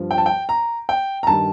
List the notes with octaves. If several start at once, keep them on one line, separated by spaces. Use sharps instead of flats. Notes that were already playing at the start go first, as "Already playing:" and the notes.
Already playing: G2 F3
G5
A5
G5
A#5
G5
A#5
G2 D#3 G3 A5